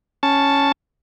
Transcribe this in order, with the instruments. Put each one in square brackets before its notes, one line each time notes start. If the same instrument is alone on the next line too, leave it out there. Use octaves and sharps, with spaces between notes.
[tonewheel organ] C#4 A5